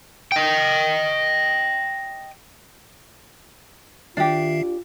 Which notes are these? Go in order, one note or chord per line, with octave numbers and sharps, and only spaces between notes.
D#5 G5
D#3 D4 F4 G4 E5 C7